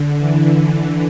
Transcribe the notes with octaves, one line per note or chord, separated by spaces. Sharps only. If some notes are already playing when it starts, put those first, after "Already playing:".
Already playing: D3
E3